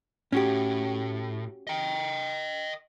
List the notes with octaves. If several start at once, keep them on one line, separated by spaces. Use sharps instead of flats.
A2 C#4 F#4 G4
D#5 G5